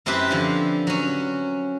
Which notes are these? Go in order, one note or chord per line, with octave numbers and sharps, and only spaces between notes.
F#2 C4 E4 G4 B4
D3 F3
F#3 C#4